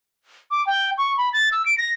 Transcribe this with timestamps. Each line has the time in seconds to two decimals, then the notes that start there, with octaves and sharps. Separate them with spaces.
0.51 D6
0.67 G5
0.98 C#6
1.18 B5
1.33 A6
1.52 E6
1.66 D7
1.78 A#6